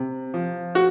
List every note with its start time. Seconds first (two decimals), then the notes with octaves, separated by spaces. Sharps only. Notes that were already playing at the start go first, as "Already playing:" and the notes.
Already playing: C3
0.34 F3
0.75 F#4